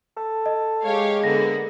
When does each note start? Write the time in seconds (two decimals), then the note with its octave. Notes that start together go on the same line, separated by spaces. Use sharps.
0.17 A4
0.46 D#5
0.84 G#3 G4 C#5 F5
1.23 D3 A#3 B3 A#6